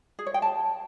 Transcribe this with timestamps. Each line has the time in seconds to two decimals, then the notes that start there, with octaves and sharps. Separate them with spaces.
0.19 G#4
0.26 C#5
0.34 G5
0.42 A5